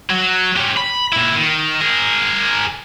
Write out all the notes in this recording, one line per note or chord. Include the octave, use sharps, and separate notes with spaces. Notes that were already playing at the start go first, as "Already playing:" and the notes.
F#3
C#4 G4
B5
A#2 E4
D#3
G#4 A#4